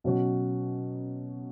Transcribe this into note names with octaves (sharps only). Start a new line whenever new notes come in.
B2 F#3 C#4 F#4